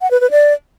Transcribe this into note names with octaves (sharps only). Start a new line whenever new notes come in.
F#5
B4
B4
D5